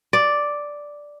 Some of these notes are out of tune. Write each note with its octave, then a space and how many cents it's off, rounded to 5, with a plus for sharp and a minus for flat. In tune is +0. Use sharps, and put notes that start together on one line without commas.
D5 +0